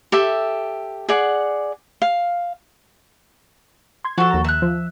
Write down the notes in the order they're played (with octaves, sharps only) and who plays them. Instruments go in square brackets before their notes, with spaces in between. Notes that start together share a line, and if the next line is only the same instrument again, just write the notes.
[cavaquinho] G4 A4 E5
G#4 D5 F#5
F5
[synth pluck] C6 G#6
[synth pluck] F3 [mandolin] F#4 A4
[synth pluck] D#2 A#5
[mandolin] E5 F#6
[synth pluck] F3